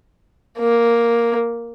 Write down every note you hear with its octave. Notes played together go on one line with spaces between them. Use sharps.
A#3